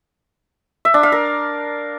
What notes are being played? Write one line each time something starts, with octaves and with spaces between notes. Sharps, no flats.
E5
D4
F5
A#4